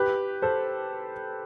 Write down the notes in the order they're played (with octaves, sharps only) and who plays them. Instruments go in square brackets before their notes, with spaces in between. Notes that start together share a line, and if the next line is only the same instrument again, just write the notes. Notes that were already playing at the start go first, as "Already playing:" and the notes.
Already playing: [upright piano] G4 B4
A4 C5